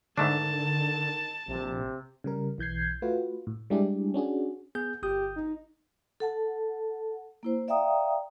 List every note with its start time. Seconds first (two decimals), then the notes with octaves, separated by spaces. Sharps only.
0.18 G#2 D3 D#3 A3 D4 A5
1.48 A#1 C3
2.24 C#3 G3 A#4
2.58 B1 E3 G6 G#6 C7
3.02 A3 F4 F#4 B4
3.47 A2
3.70 G3 G#3 D4 E4 G4 G#4
4.14 C#4 D4 F#4 G#4
4.75 B3 G#4 G6
5.03 G1 G4 D#6 G6
5.36 D#4
6.20 A4 F#5 A5
7.43 A#3 E4 C5
7.68 D5 E5 F5 G5 A#5 D#6